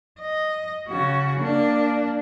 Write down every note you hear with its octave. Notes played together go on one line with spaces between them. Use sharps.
D#5
C#3 F#4
A#3 D4